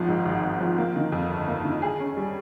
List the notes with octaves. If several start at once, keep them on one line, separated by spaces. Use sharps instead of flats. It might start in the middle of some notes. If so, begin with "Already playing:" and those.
Already playing: G#1 F3
G#2
G#1
G#1
F3
A#3
D#3
F2
G1
A#3
D#3
G#4
C#4
G3